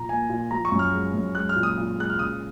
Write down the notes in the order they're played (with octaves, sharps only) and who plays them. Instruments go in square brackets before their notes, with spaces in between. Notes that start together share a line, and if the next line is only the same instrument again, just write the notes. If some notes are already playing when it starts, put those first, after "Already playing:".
Already playing: [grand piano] A#2 F3 A#5
A#3 G#5
A#2
F3 A#5
C#6
F#2
F6
G#3
F#2
G#3 F#6
F6
A#2
D#6
A#2
G#3 F#6
F6
C#3 D#6